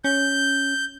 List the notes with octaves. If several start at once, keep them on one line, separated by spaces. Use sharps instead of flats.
C#4 G6